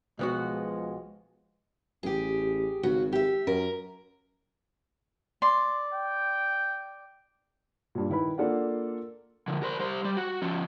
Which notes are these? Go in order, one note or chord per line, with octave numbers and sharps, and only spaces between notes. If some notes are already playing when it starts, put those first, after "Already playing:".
B1 F3 G#3 B3 F#4
A1 G4 G#4
G#1 C#3 F#4
G4 E5
F#2 A#4
D5 C6
G5
G2 A#2
D#3 E4 B4 B5
A#3 D4 F4 A4 D5 F#5
D3 F3
A#4 C5
G3 C5
G3
F#4
F3 C#4